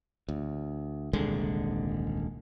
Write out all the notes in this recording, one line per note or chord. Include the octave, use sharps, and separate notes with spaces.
D2
D#1 C2 D3 G#3